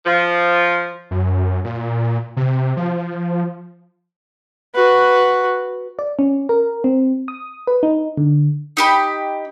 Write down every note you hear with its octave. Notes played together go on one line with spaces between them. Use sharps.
F3
F#2
A#2
C3
F3
F#4 B4
D5
C#4
A#4
C4
D#6
B4
D#4
D3
D#4 G4 B5